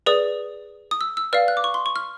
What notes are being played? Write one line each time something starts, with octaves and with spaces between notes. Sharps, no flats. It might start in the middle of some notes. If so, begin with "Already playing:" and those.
G#4 B4 D5 D#6
D#6
E6
E6
B4 D5 F5 F6
F#6
D6
C#6
C6
C#6
F6